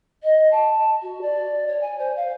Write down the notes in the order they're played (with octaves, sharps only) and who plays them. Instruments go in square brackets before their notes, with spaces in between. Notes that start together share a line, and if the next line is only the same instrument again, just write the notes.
[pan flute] D#5
A5
F#4
D5
C#5
G#5
C5
F5